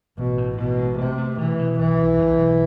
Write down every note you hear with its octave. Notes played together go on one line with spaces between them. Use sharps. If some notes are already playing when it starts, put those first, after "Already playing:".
A1 B2
A2
A1 B2
G#3
C3 A3
A3
B2 E3
B2
B1 E3
B1
B1
B1